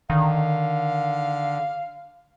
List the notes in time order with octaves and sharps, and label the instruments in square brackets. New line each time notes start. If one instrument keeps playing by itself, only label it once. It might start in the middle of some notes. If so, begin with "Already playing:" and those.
[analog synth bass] D3 [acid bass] D#3 [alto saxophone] F5